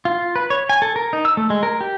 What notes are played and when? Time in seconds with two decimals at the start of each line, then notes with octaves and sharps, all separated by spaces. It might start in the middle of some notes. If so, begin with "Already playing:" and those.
0.05 F4
0.36 B4
0.50 C#5
0.69 G#5
0.82 A4
0.96 A#4
1.13 D#4
1.25 E6
1.37 A3
1.50 G#3
1.63 A#4
1.81 G4